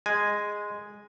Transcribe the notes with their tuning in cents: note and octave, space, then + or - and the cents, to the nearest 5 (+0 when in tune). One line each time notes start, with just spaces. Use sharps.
G#3 -5 G#5 +0